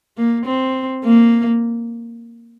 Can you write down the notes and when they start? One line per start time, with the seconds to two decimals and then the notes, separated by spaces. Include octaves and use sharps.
0.18 A#3
0.46 C4
1.05 A#3